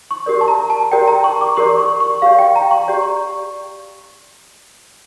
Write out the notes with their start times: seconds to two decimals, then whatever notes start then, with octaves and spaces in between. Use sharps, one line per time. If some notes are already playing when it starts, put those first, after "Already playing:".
0.11 C#6
0.26 G4 A#4 D5
0.41 A5
0.48 A#5
0.70 A5
0.92 G4 A#4 D5 G5
1.08 A#5
1.24 C#6
1.41 D6
1.57 G4 A#4 D5 C#6
1.78 C#6
2.00 C#6
2.22 G4 D5 F5
2.39 G5
2.56 A#5
2.71 C#6
2.88 G4 D5